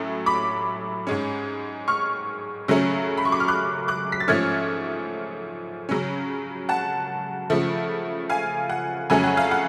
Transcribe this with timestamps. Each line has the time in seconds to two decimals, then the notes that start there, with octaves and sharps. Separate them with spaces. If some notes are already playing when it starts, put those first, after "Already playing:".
Already playing: A2 F#3 A3 C#4
0.26 B5 D6
1.07 G#2 G#3 C#4
1.88 C#6 F6
2.68 C#3 F#3 A3 C#4
3.17 B5
3.25 C#6
3.32 D6
3.40 F6
3.48 D6 F#6
3.88 D6 F#6
4.12 B6
4.20 A6
4.28 G#2 F3 A3 C#4 F6 G#6
5.89 C#3 F#3 C#4
6.69 F#5 A5
7.50 C#3 F3 A3
8.30 F5 G#5
8.69 F#5
9.10 F2 C#3 F#3 A3 C#4 G#5
9.24 F#5
9.37 F5
9.51 F#5